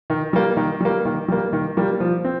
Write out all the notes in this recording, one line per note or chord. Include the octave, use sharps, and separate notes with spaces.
D#3
G3 A#3
D#3
G3 A#3
D#3
G3 A#3
D#3
G3 A#3
F3
C4